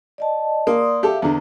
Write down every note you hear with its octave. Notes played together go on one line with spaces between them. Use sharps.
D5 D#5 A5
A#3 D5 C6 D#6
G4 A4 E5 F5
E2 D3 A#5